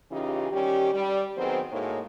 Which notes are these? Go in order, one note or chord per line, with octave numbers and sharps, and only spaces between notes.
C#3 E3 C#4 D#4 F4 G4
D#3 G3 C#4 G4
G3
D#3 F#3 B3 C4 G#4 C5
A2 G#3 A#3 D#4 F#4 C#5